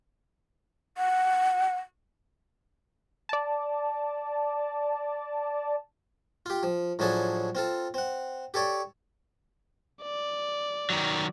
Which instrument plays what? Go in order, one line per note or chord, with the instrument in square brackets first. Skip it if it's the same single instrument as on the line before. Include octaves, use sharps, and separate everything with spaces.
[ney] F#5
[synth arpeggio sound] D5 A5
[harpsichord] F4 G4
F3
A2 F3 F#3 D4 G#4 A4
C4 F4 A4
C4 F#5
G4 A4 C#5 D5
[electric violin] D5
[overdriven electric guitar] D#3 F#3